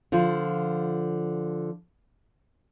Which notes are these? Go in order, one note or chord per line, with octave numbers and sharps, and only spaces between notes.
D3 F3 F4